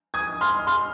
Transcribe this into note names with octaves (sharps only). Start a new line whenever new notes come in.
D#6 G#6
C6 F6
C6 F6